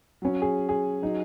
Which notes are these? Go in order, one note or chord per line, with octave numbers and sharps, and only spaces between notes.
F#3 C#4
G#4
G#4
F#3 D#4